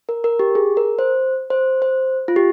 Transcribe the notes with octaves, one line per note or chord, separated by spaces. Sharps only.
A#4
A#4
G4
G#4
A#4
C5
C5
C5
F4
G4